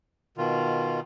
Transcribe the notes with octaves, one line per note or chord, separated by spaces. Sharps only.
B2 D#3 F4